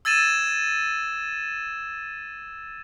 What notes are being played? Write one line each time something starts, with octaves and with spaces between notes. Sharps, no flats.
E6 G#6 A6 D#7 E7